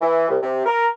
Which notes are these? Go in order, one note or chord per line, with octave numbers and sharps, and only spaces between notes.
E3
C2
C3
A#4